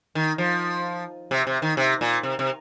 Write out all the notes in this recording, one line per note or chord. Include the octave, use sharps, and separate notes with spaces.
D#3
F3
C3
C3
D#3
C3
A#2
C3
C3